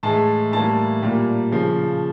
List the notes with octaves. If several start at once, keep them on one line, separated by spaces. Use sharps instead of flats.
A2 E3 G#3 A5
A2 E3 G3 A#3 A5
A#2 G3 A#3
C#3 F3